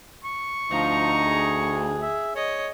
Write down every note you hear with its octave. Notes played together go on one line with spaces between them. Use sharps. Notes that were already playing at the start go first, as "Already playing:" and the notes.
C#6
D2 F3 D#4 A#5
G#4
E5
C#5 D#5